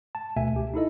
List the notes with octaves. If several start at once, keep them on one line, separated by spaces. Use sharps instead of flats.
A5
D2 B2 A3 E5 G#5
C#2 G4
D#4 E4 A4 D#5